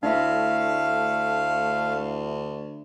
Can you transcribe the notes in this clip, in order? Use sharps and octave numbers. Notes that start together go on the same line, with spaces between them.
D2 A3 D4 E4 E5 F5